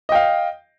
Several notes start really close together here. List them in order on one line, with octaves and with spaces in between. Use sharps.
D#5 G5 F5